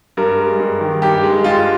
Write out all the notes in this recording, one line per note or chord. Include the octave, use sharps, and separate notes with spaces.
G2 A#4
G#3
G2
D#3
G2 G4
G#3
G2 F4